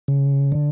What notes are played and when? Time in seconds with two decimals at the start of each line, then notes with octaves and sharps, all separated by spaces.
0.08 C#3
0.52 D3